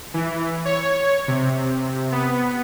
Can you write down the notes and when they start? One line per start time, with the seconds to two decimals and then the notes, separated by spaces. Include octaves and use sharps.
0.14 E3
0.65 C#5
1.28 C3
2.12 B3